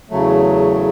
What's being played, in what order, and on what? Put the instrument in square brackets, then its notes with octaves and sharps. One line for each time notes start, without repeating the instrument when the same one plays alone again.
[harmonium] E2 C#3 F#3 A3